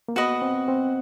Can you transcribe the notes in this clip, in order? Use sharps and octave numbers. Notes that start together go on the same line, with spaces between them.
A#3
B3 F#4 B4 D#5
C4
C4